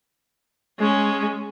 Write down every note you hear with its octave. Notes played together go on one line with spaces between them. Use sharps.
G#3 C#4